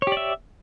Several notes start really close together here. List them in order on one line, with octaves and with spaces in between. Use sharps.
C#5 G4 D5 E5